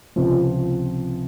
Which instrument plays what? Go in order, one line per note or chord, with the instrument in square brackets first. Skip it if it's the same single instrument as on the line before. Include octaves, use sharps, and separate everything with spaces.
[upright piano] C#2 C3 F3 C4 F4